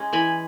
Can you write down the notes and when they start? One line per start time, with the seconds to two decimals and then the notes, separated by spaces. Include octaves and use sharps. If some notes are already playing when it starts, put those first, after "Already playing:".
Already playing: G#3 C#4
0.13 E3 G#5 B5